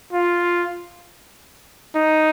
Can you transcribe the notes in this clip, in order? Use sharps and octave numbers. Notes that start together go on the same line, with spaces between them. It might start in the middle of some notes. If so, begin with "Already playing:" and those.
F4
D#4